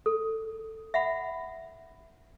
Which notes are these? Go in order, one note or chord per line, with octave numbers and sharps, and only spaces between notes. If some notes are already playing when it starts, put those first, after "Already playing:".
A4
E5 F#5 B5